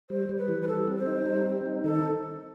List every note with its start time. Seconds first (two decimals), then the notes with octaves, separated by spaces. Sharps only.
0.10 G3 C5
0.29 G3
0.38 B4
0.48 E3
0.62 B4
0.67 G3 A4
0.87 C4
0.98 C5
1.06 D#4
1.26 G3
1.46 C4
1.66 D#4
1.84 D#3 A4